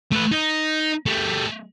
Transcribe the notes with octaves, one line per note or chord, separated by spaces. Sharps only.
A3 B4
D#4
G3 A3